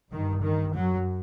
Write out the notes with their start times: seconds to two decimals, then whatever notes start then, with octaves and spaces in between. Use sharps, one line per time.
0.11 G2 D#3
0.42 D#3
0.74 F#2 F#3